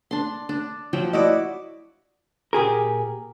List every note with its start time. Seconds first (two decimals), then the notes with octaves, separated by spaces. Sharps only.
0.11 D4 C6
0.49 D4
0.93 F3 F#3 G5
1.13 E4 F#4 D5 D#5 D6
2.53 A#2 G4 G#4 A#4